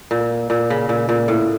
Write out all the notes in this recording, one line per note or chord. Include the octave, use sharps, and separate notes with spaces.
A#2
A#2
C#3
A#2
A#2
A2